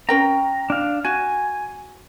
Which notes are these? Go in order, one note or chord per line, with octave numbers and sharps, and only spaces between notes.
C#4 A#4 G5 A#5
D4 F5
F#4 G#5